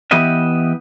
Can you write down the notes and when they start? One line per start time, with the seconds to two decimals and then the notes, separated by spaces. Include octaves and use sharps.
0.11 E3 B3 G4 B4 D#5 E5